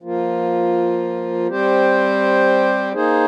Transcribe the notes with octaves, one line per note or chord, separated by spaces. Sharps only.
F3 A#3 F4
G3 C4 G4 C5
A#3 D#4 G#4 C5